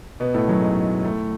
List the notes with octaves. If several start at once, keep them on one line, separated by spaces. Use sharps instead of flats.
B2 B3
A2 A3
F#2 F#3
G#2 G#3
A2 A3